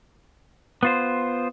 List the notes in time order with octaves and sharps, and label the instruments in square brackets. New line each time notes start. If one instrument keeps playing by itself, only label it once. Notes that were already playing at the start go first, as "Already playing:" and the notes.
[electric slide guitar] B3 F4 C5